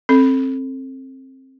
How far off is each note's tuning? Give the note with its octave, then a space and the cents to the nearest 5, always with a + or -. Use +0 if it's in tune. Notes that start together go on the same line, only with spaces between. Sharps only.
C4 +20 A4 +10